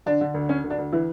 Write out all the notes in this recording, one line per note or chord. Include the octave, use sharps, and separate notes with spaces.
D3 D4
D3
D2
D3 C#4
D2
D4
D2
E3 E4